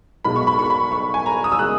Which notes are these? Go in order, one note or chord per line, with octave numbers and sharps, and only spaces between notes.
B1 B2 G#3 B5
C#6
B5
C#6
B5
C#6
G#5
A#5
D#6
E6
C#3 G#3 F#6